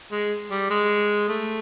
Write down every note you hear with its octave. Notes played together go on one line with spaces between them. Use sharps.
G#3
G3
G#3
A3